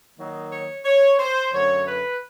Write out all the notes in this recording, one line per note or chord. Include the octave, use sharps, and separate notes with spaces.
D#3 F#3 A#3 D#4
C#5
C#5
C5
F#2 D3 F#3 A3 C#5
B4